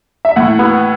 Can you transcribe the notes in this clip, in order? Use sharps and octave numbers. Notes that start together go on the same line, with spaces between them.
E5
A2 F#5
B3